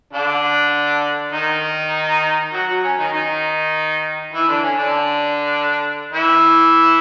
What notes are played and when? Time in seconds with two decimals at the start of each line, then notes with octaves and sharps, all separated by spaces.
0.13 D3 D4
1.33 D#3 D#4
2.53 F#3 F#4
2.68 F#3 F#4
2.83 C#4
2.98 D#3 D#4
3.13 D#3 D#4
4.33 E3 E4
4.48 D3 D4
4.63 C#4
4.78 D3 D4
6.13 E3 E4